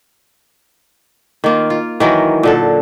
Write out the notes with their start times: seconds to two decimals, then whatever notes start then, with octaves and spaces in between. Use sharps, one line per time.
1.44 D#3 A#3 F4
1.70 F4
2.00 D#3 E3 F#3 A#4
2.43 A#2 D3 A4